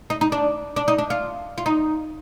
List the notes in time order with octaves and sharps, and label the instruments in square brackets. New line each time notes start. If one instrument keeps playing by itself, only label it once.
[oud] D#4
D#4
D4
D4
D#4
D4
F4
F4
D#4